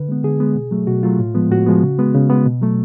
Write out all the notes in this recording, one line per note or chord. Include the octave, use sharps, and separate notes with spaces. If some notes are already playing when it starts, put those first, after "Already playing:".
Already playing: D3 B4
G#3 B3
D3 G#4
G#3 B3
B2
F#3 A3
B2 F#4
F#3 A3 F4
A2
F3 G#3 B3
A2 F#4
F3 G#3 B3
C#3
G#3 B3
C#3
G#3 B3
B2
F#3 A3